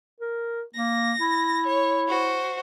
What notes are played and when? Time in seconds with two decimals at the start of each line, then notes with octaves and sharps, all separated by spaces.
0.20 A#4
0.74 A#3 A#6
1.20 E4
1.66 C#5
2.06 F#4 C5